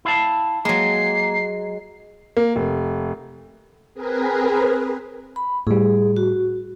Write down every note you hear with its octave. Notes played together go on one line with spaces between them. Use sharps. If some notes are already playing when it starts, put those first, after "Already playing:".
E4 F5 A5
F#3 G#3 A#3 C7
A#3
F1
C4 G#4 A#4 B4
B5
A2 G3 G#4
F#4